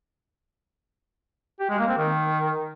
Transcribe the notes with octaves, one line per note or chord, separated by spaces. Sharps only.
G4
G#3
A#3
C4
D#3